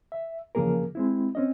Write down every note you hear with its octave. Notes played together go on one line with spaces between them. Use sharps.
E5
E2 C#3 F3 A#3 G#4 A#4
G#3 C4 E4
C4 C#4 D#5